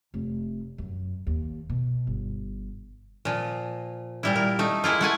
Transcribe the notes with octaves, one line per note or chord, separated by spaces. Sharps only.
F1
F#2
D#2
B2
G1
A#2 F3
A#2 G3 E4
A#4
A3 D#4
G#3 A#3 E4 F4
A3 F#5 G#5